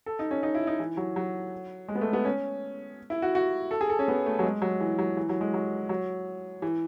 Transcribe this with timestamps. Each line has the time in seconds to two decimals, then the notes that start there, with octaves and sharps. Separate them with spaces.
0.06 A4
0.19 D#4
0.31 C#4
0.43 D#4
0.55 E4
0.67 D#4
0.79 E3
0.97 F#3
1.16 F#3
1.88 G#3
1.95 B3
2.01 A3
2.13 B3
2.25 C#4
3.10 E4
3.22 F#4
3.35 F#4
3.71 A4
3.81 G#4
3.90 A4
3.99 C#4
4.08 B3
4.26 A3
4.39 F#3
4.43 G#3
4.62 F#3
4.80 E3
4.99 F#3
5.17 E3
5.29 F#3
5.41 G#3
5.54 F#3
5.89 F#3
6.62 E3